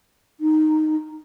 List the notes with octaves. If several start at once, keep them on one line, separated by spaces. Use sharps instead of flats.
D#4